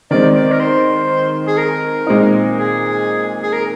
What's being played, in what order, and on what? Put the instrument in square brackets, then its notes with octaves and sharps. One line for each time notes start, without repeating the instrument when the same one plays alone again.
[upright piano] D#3 G#3 C4 [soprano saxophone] D5
[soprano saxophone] D5
A#4
C5
G#4
A#4
[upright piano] A#2 G#3 C4 D#4
[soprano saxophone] G#4
G#4
A#4